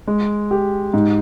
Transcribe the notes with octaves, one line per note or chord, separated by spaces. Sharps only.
G#3
G4
G#2